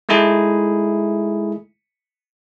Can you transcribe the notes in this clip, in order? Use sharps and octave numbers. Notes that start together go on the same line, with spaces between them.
G#3 A3 D#4 E4 G#4